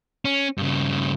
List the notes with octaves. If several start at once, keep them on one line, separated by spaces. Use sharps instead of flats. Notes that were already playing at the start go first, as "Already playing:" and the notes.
C#4
G2 C#3